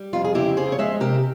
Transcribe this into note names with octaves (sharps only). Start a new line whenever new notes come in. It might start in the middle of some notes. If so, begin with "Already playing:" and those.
Already playing: G3
F2 F4
G#4
C#3 E4 G4
F2 G#4 C5
C#5
G#3 C5 E5
C3 G4 A#4